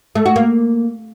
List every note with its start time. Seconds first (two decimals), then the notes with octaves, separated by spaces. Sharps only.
0.15 A3
0.26 F#4
0.36 A#3